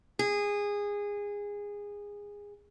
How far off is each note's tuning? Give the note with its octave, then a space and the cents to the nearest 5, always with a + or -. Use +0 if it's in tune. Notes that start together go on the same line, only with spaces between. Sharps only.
G#4 -20